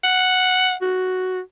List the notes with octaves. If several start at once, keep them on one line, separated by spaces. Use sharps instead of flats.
F#5
F#4